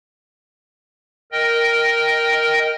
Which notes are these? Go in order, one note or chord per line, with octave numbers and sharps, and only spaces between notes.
A#4 D#5 G5